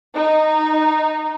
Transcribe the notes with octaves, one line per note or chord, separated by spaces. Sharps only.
D#4